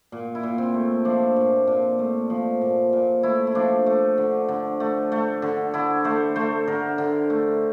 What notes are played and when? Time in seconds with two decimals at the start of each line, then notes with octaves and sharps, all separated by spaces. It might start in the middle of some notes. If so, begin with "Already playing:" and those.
0.12 A#2
0.35 E4
0.43 A#2
0.58 C4
0.74 A3
1.05 F3 D4
1.36 A#2
1.67 A#2
1.99 A3
2.30 F3
2.61 A#2
2.93 A#2
3.23 A3 E4
3.47 E4
3.55 F3 D4
3.86 A3
4.18 D3
4.48 D3
4.80 A3
5.12 A3
5.42 D3
5.74 D3 E4
6.04 A3 C5
6.36 A3 C5
6.68 D3 A#4
6.98 D3
7.30 A3